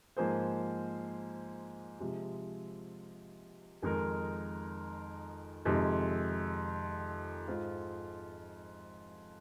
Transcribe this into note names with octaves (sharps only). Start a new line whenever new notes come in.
G#2 F3 A#3 G#4 C5
C3 F3 G#3
F2 D#3 G#3 D#4 A#4
F2 C3 D#3 G#3
G#2 G#3 F4 C5